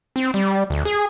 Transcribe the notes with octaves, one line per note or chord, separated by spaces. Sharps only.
C4
G3
D2
G#4